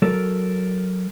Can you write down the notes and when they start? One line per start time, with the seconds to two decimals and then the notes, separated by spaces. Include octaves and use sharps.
0.02 F#3 A4 A#4